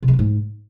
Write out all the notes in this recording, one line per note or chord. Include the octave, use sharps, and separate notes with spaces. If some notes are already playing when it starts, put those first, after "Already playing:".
C3
G#3
B3
G#2